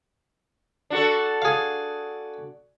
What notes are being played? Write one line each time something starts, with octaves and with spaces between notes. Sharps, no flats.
D4 F#4 A4
G#4 F5